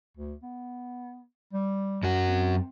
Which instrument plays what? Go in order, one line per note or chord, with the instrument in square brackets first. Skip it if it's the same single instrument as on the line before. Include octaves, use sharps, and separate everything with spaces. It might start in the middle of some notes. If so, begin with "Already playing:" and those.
[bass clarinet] D2
B3
G3
[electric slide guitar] F#2 F#4
[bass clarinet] C4